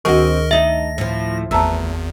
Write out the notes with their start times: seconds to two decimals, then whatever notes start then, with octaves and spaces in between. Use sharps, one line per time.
0.05 D2 D#3 C4 F#4 G#4 A#4 D#5 C#6
0.51 A3 D#4 E5 A#6
0.98 A2 F3
1.51 G#1 E2 E3 A3 A5 A#5 E6